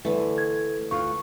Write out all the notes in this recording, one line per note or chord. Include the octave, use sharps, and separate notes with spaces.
D3 E3 A3
G#6
D2 F4 C#6